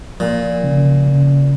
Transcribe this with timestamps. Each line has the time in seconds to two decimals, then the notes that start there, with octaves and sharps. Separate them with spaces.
0.20 A#2 F3
0.64 C#3
1.07 C#3